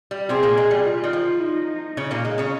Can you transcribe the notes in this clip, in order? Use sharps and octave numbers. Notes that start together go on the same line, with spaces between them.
G3
C3 C4 G#4
A#2 A#3
G#3
G3
F4
D#3
F3
D#4
C#3 C#4
A#2 A#3
G#3
C#3 C#4